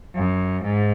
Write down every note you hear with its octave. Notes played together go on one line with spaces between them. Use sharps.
F#2
G#2